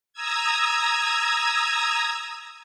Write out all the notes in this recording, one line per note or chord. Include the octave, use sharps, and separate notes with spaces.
A#5 D#6 E6 G#6